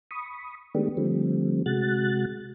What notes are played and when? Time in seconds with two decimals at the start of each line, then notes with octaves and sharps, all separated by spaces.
0.11 B5 C#6 D#6
0.75 D#3 G#3 A3 B3 D4 G4
0.97 D3 F3 G3 A3 C4
1.66 C3 G#3 F#4 F#6 A6